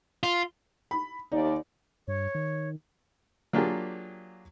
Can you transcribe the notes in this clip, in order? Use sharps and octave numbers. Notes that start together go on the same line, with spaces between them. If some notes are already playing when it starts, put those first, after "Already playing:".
F4
B5
D#2 D#4 D5
G2 C#5
D#3
F#3 A#3 D4 F4 G4 G#4